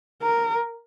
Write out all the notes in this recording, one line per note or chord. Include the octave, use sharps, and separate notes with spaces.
A#4